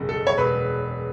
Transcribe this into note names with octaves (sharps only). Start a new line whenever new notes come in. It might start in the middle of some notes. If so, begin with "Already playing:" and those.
Already playing: F#1 E2 B2
A4
C#5
E1 B4